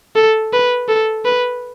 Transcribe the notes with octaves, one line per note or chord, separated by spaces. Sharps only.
A4
B4
A4
B4